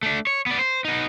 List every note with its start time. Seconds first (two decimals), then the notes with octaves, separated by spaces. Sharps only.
0.03 A3 D4
0.27 C#5
0.46 B3 D5
0.59 C5
0.85 B3 D#4